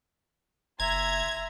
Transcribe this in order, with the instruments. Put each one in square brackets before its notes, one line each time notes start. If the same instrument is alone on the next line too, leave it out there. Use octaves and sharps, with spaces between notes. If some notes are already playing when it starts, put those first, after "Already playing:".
[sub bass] F#1 [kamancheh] E5 C6 [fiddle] A#5 [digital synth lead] G#6